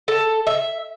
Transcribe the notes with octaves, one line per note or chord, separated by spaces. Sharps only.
A4
E5